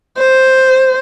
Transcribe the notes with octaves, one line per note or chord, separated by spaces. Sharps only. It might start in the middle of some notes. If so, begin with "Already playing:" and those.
C5